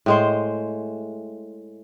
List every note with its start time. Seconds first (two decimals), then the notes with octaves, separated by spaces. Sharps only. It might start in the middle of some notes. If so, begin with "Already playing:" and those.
0.06 A2 G#3 C5